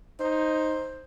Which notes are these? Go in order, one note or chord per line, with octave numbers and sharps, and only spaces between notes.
D#4 C5